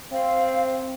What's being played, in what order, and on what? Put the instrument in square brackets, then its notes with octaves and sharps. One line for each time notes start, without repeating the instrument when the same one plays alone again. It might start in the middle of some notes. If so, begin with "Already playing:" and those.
[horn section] C4 [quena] F5